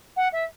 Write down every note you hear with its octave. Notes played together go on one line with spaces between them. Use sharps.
F#5
E5